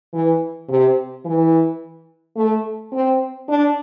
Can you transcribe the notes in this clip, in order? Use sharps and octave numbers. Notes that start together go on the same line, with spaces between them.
E3
C3
E3
A3
C4
D4